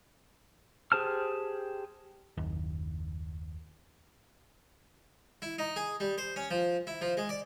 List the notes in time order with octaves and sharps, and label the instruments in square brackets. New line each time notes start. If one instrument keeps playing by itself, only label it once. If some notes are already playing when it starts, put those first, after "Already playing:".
[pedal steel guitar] G4 G#4 C5 A5 F6
[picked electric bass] F#1 D#2
[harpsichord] E4
D#4
G#4
G3
C5
C#4
F3
E4
F3
G#3
D5